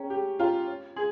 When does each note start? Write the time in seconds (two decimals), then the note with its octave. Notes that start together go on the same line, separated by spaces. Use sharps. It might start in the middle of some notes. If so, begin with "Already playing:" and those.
Already playing: C#4 G#4 C#5 G5 A#5
0.10 G4 G#4
0.39 F4 C#5 G5 A#5
0.67 C#5
0.96 G#4 C6